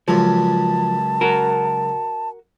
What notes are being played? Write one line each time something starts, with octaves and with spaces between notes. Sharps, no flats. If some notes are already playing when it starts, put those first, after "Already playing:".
C#2 F#2 F3 A5
F#4 A#4